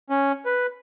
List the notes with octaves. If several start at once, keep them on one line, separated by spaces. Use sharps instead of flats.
C#4
B4